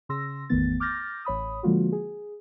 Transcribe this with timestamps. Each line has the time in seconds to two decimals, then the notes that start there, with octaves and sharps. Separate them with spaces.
0.09 C#3 C6 E6 A#6
0.50 G#1 E2 D#3 A3 B3 A6
0.80 D6 F6 G6 A6 A#6
1.25 A1 C#5 B5 D#6
1.63 D3 F3 G#3 A#3 F4 F#4
1.92 G#4